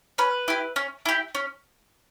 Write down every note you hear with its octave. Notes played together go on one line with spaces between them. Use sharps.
C#4 B4
E4 G4
C#4
E4 G4
C#4